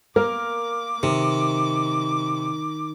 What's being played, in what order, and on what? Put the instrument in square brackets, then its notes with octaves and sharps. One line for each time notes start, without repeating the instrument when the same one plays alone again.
[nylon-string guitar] A#3 [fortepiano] A#4 [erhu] D6
[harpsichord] C3 [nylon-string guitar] D#3